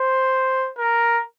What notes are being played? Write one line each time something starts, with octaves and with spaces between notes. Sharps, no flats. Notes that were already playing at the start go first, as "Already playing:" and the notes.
Already playing: C5
A#4